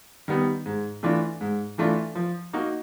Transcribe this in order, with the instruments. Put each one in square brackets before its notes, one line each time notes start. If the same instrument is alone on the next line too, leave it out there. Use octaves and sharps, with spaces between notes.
[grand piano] D#3 G3 B3
G#2
E3 A3 D4 F4
G#2
E3 A3 D4 F4
F3
A#3 D#4 F#4